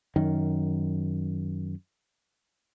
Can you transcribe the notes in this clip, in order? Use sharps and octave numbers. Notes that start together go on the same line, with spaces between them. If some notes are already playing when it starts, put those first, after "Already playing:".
F#2 D#3